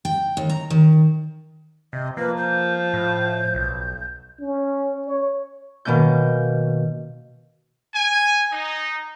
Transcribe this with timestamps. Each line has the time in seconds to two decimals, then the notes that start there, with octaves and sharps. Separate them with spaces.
0.05 G5
0.37 D#2
0.49 A#5
0.70 D#3
1.93 C3 D#5
2.17 F3 A#3 B4
2.38 G6
2.94 A2
3.55 B1
4.40 C#4
5.06 C#5
5.85 B2 D#3 A#3 C#4 G6
7.94 G#5
8.51 D#4